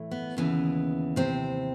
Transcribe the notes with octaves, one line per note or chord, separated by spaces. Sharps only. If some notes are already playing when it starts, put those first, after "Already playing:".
Already playing: A2 E3 A3
B3
D#2 C#3 E3 B3
C3 C4